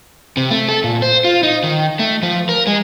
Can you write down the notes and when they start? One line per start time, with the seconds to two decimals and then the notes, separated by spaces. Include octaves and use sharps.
0.37 C3
0.51 A3
0.68 A4
0.84 A#2
1.02 C5
1.24 F4
1.43 D#4
1.64 D#3
1.99 A3
2.23 F3
2.49 A#4
2.67 G#3